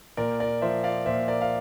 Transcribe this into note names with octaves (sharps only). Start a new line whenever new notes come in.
A#2 A#4 D5
A#4 D5
F3 C5 E5
D5 F5
A#2 C5 E5
A#4 D5
F5